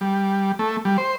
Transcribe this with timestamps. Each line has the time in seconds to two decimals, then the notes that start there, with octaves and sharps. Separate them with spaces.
0.01 G3
0.59 A3
0.85 G3
0.98 C5